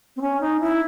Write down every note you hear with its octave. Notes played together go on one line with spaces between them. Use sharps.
C4
C#4
D#4
E4